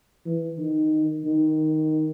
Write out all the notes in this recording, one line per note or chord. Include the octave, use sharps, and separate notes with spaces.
E3
D#3
D#3